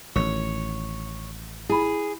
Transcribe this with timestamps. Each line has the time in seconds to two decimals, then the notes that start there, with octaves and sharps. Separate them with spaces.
0.16 A1 D#3 C#5
1.70 E4 G#4 B5